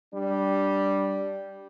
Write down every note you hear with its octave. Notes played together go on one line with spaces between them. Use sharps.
G3 D4